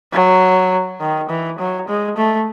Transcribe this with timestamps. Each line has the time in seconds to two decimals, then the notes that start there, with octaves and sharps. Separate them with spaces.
0.13 F#3
1.01 D#3
1.29 E3
1.59 F#3
1.88 G#3
2.17 A3